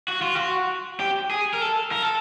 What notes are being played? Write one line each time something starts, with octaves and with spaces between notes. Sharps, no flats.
F#4
F4
F#4
G4
G#4
A#4
A4
A#4
A4